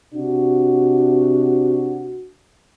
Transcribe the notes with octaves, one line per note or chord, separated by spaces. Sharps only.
C3 D4 F#4